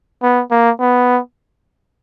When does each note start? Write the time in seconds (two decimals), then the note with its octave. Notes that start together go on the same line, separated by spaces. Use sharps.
0.23 B3
0.51 A#3
0.80 B3